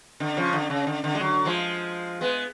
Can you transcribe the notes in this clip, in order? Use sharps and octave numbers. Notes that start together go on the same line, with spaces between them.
D3
C#3 F3
D3
C#3
D3
D3
G#3
D3 F#3
F3 G#3
G#3 B3